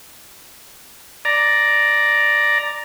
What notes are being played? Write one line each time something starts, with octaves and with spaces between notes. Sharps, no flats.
D5 A#5